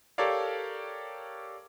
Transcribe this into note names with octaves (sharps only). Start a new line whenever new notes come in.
G4 A4 A#4 C#5 D5 F5